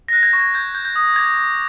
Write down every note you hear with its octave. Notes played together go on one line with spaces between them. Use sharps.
A#6
F#6
G#6
C#6
G#6
G6 G#6
G6
G6
D#6
D6 G#6
D6